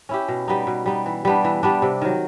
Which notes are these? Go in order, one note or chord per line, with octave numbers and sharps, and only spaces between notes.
C#4 E4 G4
B2
G3 B3 D#4
B2
G3 B3 D#4
E3
G3 B3 D4
E3
G3 B3 D4
C3
D#3 F#3